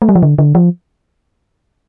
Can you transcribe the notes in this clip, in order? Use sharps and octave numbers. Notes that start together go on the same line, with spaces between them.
A3
G3
F3
D3
D3
F3